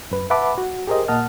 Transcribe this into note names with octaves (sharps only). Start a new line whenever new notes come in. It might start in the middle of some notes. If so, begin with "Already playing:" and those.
F#2 B4
B4 E5 F#5 A5 B5 D6
F#4
G4 G#4 A#4 C5 D#5
A#2 A#3 D#5 F#5 A5 F6